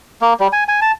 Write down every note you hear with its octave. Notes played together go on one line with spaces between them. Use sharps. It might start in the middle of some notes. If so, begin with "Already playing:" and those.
A#3
G3
G#5
G#5
A5